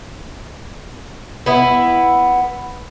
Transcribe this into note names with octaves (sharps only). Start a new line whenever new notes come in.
B3 E4